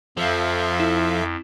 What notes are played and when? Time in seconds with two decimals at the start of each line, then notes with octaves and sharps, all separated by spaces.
0.17 F2 F3 A4 E5 F5
0.80 E4